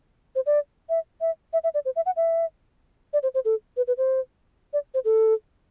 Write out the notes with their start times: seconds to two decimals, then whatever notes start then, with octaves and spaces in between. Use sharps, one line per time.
0.35 C5
0.46 D5
0.89 E5
1.21 E5
1.53 E5
1.64 E5
1.74 D5
1.85 C5
1.96 E5
2.06 F#5
2.16 E5
3.13 D5
3.23 C5
3.34 C5
3.45 A4
3.77 B4
3.87 B4
3.97 C5
4.73 D5
4.94 C5
5.05 A4